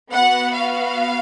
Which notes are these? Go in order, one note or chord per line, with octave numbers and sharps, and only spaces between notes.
B3 F#4 F#5
F5